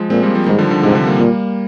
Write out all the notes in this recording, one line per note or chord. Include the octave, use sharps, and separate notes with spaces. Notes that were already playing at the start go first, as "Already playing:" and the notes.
Already playing: F3 G#3
A#2 G#3 C4
G3 A#3
F3 G#3
G#2 D#3 G3
D3 F3
D3
G#2 C3
D3
G3 A#3
A#2